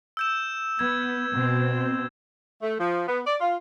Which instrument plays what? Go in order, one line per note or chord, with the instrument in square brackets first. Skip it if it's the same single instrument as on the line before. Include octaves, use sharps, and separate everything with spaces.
[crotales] E6 G6 E7
[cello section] B3 [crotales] G#6
[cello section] B2 C4
[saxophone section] A3
F3
B3
D5
F4